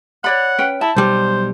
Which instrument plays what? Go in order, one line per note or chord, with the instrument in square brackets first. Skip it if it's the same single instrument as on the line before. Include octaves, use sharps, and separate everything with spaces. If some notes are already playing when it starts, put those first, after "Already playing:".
[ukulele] C#5 D5 B5 [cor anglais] F#5
[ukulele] C#4 B4 G5
[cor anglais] E4 [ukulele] A5
[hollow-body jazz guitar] B1 G3 [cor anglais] C5